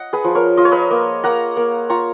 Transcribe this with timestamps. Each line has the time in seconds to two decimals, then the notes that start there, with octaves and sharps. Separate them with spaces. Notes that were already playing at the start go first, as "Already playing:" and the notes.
Already playing: D#5 F#5
0.13 G#4 B4
0.24 F3
0.35 A#4 C#5
0.57 F4 D#5
0.65 C#5
0.72 B4 D#5
0.91 A#3
1.24 A#3 F#5 A#5
1.57 A#3
1.89 F4 A#5 C#6